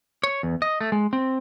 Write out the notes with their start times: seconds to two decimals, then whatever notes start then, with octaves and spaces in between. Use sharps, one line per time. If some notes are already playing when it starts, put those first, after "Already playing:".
0.23 C#5
0.43 E2
0.62 D#5
0.81 A3
0.92 G#3
1.13 C4